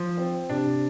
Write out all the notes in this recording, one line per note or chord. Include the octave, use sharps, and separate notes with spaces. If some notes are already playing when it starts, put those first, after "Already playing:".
Already playing: F3
C4
C3 D4